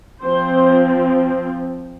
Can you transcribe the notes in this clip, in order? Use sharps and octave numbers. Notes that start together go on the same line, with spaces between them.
F3 C4 C5